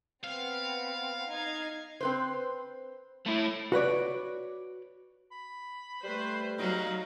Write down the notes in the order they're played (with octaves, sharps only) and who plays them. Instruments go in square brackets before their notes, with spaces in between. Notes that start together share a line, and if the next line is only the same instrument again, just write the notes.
[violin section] B3 C4 [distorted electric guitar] F5
[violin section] D#4 G#6
[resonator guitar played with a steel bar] C4 B4 C5
[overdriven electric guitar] A3 E4
[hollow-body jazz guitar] F#4 B4 C#5 D5
[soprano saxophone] B5
[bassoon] G3 [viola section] A3 B4 C5
[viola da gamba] F#3 [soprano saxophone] D#4 [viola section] F#4 F5